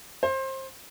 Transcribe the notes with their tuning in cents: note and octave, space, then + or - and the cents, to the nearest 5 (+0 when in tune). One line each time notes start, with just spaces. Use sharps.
C5 +25